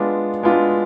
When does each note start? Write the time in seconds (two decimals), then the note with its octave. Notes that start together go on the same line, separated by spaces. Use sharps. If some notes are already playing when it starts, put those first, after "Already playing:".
Already playing: G#3 B3 D4 F4
0.43 G#3 B3 D4 F4